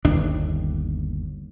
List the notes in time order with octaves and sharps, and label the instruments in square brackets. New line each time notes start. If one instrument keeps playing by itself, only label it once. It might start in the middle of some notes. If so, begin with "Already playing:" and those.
[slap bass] G1 D#2 D4